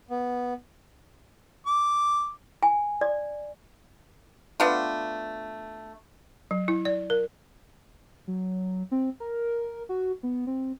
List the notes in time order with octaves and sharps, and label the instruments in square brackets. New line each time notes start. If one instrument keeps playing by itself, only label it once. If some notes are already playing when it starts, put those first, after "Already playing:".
[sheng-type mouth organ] B3
[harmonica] D6
[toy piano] G#5
D5
[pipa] A3 B3 D4 F4
[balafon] F#3
E4
D5
A#4
[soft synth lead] F#3
C4
A#4
F#4
B3
C4